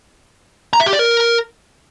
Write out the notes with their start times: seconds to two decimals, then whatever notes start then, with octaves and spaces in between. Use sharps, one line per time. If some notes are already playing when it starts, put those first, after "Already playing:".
0.73 A#5
0.80 E5
0.86 G4
0.93 D5
0.99 A#4